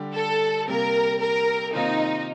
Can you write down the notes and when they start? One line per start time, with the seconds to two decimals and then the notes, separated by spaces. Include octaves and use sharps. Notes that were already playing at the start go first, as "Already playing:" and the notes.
Already playing: D3 G3 D4 G4
0.14 A4
0.68 C3 G3 A#3 A#4
1.20 A#4
1.74 C3 D#3 A#3 D#4 F4 C5